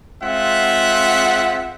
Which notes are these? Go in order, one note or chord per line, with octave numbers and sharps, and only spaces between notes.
G#3 C4 F4 E5 F#5